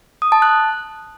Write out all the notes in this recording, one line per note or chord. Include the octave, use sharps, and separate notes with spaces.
D#6
A5
F#6